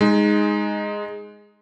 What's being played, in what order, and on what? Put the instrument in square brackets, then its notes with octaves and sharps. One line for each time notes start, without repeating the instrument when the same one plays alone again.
[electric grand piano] G#3 D#4